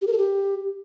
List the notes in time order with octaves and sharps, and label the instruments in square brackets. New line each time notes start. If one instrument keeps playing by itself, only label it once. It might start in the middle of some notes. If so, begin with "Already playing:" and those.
[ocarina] G4
A#4
A4
G4